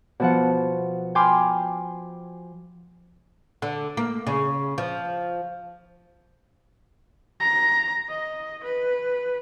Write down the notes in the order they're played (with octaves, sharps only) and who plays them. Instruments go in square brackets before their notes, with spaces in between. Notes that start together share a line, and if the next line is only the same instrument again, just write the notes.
[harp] B2 F3 F#5
G5 G#5 B5 C6 D6 F6
[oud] D3
A#3
C#3
F3
[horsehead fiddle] A#5
D#5
B4